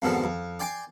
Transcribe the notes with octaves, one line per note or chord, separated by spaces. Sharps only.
F2 G#2 B2 D3 D#3 F3
F2
D5 G5 G#5 C6 D6